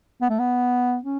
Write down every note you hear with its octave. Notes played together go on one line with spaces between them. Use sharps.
B3
A3
B3
C#4